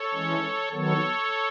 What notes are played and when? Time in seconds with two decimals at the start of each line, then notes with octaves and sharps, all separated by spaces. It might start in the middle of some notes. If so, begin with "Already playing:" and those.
Already playing: A4 C#5
0.14 E3 G#3 C#4
0.73 D#3 F#3 B3 A4 C#5